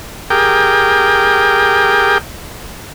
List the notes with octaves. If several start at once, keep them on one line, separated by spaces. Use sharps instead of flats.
G4 G#4 A#4 G5